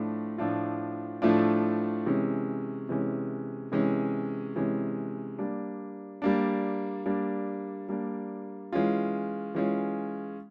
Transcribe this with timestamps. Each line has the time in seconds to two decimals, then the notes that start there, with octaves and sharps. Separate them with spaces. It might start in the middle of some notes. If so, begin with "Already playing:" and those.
Already playing: A2 F3 A3 D4 F4
0.38 A2 F3 A3 D4 F4
1.22 A2 F3 A3 D4 F4
2.06 C3 E3 G#3 C#4
2.89 C3 E3 G#3 C#4
3.72 C3 E3 G#3 C#4
4.56 C3 E3 G#3 C#4
5.39 G3 A#3 D4
6.22 G3 A#3 D4
7.06 G3 A#3 D4
7.89 G3 A#3 D4
8.72 E3 G#3 C#4 F4
9.55 E3 G#3 C#4 F4